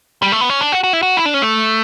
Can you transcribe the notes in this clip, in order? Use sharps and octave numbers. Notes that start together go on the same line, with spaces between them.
G3
A3
B3
C#4
D4
F#4
F#4
E4
F#4
E4
D4
C#4
A3